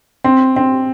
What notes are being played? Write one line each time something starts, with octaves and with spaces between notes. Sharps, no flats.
C4
C4